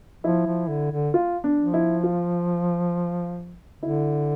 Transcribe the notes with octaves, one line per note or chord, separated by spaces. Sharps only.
F3 E4
F3
D3
D3
F4
D4
F3
E4
F4
D3 E4